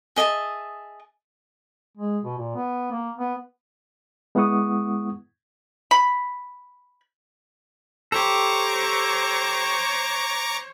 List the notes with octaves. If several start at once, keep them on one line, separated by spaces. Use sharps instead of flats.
G#4 D#5 E5 A5
G#3
B2
A#2
B3
A#3
B3
G#3 B3 E4 F#5 C#6 D#6
B5
G4 A4 C5 C#5 A#5 C#6 D6